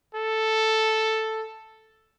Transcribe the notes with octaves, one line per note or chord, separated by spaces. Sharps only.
A4